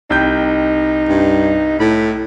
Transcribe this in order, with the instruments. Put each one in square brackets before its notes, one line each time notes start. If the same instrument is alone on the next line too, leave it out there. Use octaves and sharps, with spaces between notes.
[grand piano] C2 G5 G6 [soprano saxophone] D#4
[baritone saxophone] G2
[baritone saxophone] A2 [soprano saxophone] B5